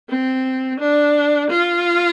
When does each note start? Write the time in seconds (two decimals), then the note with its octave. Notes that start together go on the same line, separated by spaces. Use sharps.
0.09 C4
0.80 D4
1.50 F4